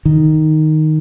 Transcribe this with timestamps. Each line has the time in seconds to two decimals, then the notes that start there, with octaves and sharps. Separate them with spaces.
0.05 D#3